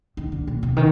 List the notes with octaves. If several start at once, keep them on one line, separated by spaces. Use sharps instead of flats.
D#3
D3
A#2
C3
D#3